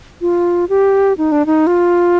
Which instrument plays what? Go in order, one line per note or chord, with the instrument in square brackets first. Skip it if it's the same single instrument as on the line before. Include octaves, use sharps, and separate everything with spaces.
[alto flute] F4
G4
D#4
D4
D#4
F4